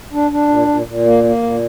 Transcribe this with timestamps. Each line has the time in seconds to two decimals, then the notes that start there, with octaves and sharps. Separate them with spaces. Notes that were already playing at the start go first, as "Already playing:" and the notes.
0.13 D4
0.31 D4
0.49 A#2
0.68 A#2
0.86 A#2
1.05 A#3
1.24 A#3
1.43 A#2